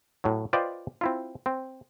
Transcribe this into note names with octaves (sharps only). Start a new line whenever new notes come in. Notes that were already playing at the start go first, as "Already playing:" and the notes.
A2 F#3
F4 B4 C5 D5 D#5 G5
C4 E4 F4
C4